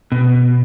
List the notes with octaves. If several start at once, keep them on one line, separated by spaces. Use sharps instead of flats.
B2